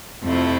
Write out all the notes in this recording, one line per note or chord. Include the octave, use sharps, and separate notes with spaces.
F2 C3 F3 A3 E4